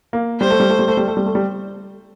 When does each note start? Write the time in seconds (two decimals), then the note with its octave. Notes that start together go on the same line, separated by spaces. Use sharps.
0.13 A#3
0.41 G3 C5
0.50 A3
0.60 G3
0.70 A3
0.79 G3
0.88 A3
0.97 G3
1.08 A3
1.17 G3
1.26 A3
1.35 G3